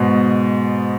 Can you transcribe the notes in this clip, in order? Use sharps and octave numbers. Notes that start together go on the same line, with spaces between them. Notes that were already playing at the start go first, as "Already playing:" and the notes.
Already playing: G#2 B2